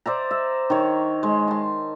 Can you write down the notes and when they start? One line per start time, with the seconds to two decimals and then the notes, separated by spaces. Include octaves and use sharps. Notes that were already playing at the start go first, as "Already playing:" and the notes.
0.06 C5 D5 E5 A#5
0.31 E5
0.70 D#3 C#5
1.23 G#3
1.48 A5 C6